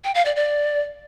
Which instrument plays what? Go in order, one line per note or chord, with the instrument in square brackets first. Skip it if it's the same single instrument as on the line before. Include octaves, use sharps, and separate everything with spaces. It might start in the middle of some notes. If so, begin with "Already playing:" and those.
[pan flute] G5
F5
D5
D5